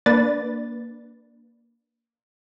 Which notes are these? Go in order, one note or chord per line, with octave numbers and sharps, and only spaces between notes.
A#3 D4 B4 D5 A6